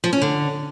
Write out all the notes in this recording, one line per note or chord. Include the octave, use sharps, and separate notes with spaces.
F3
C#4
D3